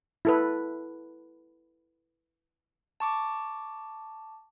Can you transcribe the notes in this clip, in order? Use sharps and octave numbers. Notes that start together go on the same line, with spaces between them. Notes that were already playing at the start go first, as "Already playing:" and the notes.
E4 A4 B4
A5 C#6 D6